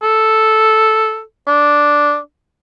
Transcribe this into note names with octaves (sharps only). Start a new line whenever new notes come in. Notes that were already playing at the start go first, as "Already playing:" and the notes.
A4
D4